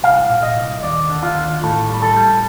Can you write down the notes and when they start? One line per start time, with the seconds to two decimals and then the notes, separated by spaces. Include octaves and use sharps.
0.03 C2 F5
0.29 A#2
0.43 D#5
0.57 C2
0.83 D#2 D5
1.09 D3
1.23 F4
1.36 D#2
1.63 A2 A4
1.89 G3
2.02 A4
2.16 G3